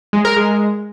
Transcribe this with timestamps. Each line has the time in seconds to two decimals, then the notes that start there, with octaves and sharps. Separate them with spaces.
0.13 G#3
0.25 A#4
0.36 G#3